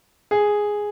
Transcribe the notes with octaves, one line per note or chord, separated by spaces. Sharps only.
G#4